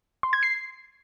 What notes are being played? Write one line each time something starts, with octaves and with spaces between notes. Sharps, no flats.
C6
G#6
C7